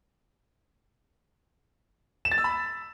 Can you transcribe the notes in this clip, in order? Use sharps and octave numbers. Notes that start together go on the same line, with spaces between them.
E7
A6
E6
B5